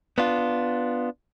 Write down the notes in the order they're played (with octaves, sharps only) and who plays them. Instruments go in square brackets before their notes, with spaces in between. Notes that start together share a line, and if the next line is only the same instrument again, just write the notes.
[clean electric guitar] B3 D4 F4